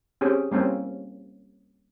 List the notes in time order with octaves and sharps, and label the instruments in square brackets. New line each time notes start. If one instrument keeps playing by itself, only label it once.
[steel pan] C4 C#4 G4 G#4
G3 A#3 C4 C#4 E4